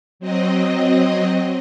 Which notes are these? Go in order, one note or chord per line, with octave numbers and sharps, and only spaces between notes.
F#3 C4 D#5